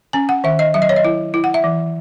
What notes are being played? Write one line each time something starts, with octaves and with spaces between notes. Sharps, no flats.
C#4 G#5
F#5
D#3 E5
D#5
F#3 E5
D#5
C#5
D#5
E4
E4
F#5
E5
E3